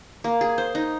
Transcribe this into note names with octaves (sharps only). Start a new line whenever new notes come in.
A#3
G#4
C5
D#4